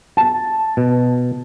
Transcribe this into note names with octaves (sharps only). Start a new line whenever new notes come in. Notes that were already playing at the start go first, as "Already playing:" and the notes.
A5
B2